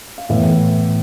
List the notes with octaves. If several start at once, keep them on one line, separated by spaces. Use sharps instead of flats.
F5
A2 E3 B3 E5